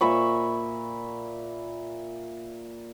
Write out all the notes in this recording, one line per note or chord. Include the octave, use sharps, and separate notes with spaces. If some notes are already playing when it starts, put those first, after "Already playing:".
A#2 E5 B5 C#6